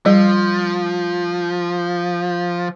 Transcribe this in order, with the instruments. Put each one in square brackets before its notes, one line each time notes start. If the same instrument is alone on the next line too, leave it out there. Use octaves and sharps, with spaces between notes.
[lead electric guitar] F3 [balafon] G3